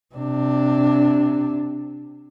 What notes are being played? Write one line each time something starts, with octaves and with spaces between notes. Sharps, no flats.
C3 D4